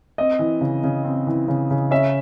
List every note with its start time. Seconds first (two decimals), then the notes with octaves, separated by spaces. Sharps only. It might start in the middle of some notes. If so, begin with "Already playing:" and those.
0.18 C4 D#5
0.39 E3
0.61 C#3
0.84 C#3
1.04 C4
1.27 E3
1.48 C#3
1.70 C#3
1.91 C#4 E5